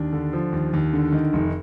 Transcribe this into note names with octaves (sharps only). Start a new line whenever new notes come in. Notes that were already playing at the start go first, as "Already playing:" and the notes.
Already playing: D#2 D4
D3
F3
D#2
D#2
D3
D#3
F1